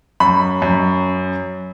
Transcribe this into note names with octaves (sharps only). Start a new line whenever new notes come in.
F#2 B5
F#2